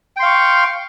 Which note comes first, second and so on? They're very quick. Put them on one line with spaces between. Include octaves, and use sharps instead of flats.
G5 C6 F5 C#6